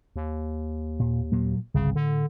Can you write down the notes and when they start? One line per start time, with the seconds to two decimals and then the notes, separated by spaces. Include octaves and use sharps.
0.16 D#2
1.00 A#2
1.32 A#2 F#3 A#3
1.74 G1 C2 C#3
1.95 A2 D3